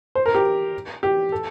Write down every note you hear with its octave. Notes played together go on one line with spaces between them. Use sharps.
C5
A#4
G4
G4
A4